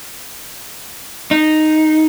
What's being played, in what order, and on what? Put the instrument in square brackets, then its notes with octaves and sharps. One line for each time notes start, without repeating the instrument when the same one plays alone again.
[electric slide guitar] D#4